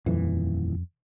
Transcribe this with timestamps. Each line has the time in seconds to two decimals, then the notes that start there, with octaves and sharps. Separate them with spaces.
0.06 D#1 F2 E3